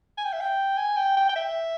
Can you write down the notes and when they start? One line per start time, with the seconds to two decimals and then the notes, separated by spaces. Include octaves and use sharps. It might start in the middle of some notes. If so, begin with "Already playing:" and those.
0.18 G#5
0.25 G5
0.33 E5
0.41 G5
0.78 G#5
0.97 G5
1.17 G5
1.29 G5
1.36 E5